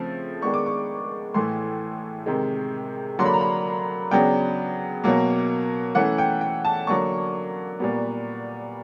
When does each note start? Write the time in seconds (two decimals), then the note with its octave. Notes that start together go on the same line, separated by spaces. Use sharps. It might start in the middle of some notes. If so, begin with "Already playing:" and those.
Already playing: C#3 F3 A3 C4
0.42 D#3 G#3 B3 D4 C#6
0.54 D6
0.66 C#6
1.34 A2 E3 A3 C6
2.26 C3 D#3 G#3
3.19 D3 F#3 A#3 D4 C6
3.26 B5
3.34 A#5
3.41 B5
4.11 C#3 F#3 B3 D4 G5
5.04 B2 F#3 A#3
5.95 E3 A3 C#4 F#5
6.18 G5
6.41 G5
6.65 A5
6.87 D3 F#3 A#3 D4 C#6
7.80 A#2 G3 B3